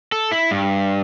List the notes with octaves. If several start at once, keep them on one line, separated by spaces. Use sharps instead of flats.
A4
E4
G2